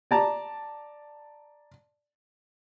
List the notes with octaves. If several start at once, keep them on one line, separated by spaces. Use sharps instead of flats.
D5 A5 A#5